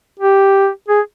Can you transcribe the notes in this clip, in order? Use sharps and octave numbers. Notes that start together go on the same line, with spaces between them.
G4
G#4